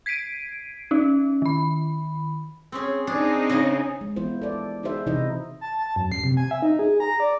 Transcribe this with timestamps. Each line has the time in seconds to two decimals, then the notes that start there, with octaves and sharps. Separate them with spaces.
0.06 G#6 B6 C7 D7 D#7
0.91 C#4 D#4
1.42 D#3 B5
2.72 C4 C#4 G#4
3.07 C4 D4 D#4 G#4
3.49 C#3 D#5 G#5
4.01 G#3
4.16 E3 B3 E4 F4 C5
4.42 A4 D5
4.83 D#4 F#4 G#4 C5 E5
5.06 C3 E3 D#4 E4 D#5
5.61 A5
5.78 A5
5.96 F#2
6.12 C7
6.24 C3
6.37 G#5
6.51 E5
6.62 D#4
6.79 G#4
7.00 A#5
7.20 D5